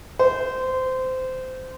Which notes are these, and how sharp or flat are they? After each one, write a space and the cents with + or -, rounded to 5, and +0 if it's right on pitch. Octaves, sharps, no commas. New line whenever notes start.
C5 -20